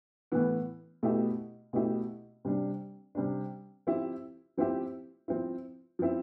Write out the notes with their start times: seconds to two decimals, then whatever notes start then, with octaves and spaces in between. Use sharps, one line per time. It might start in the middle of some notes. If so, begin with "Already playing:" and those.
0.32 A2 E3 B3
1.03 B2 A3 E4 G4
1.73 B2 A3 E4 G4
2.45 C3 G3 D4
3.15 C3 G3 D4
3.87 F3 C4 E4 G4
4.57 F3 C4 E4 G4
5.28 F3 C4 E4
5.99 F3 C4 E4